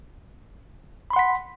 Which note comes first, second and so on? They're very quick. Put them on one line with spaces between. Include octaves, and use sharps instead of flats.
B5 C6 F#5 B6